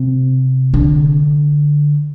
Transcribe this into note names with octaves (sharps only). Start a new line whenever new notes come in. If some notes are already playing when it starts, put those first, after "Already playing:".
Already playing: C3
D3